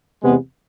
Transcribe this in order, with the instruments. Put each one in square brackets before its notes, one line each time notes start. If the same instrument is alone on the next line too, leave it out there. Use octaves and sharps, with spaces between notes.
[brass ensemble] E2 C3 G#3 B3